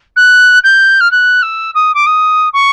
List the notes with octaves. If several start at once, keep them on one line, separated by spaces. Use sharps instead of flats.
F#6
G6
F6
F#6
E6
D#6
D6
D#6
C#6